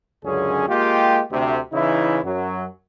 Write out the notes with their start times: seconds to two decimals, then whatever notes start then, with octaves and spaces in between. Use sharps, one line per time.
0.24 C#2 F#2 D3 C#4 G#4
0.68 G#3 A#3 F4 G4
1.31 D2 C3
1.73 C#3 E3 D#4 E4
2.24 F#2 F#3